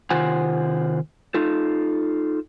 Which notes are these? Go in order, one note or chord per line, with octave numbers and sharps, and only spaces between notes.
C3 D#3 F4 C5 F#5 G#5
D#4 F4 A4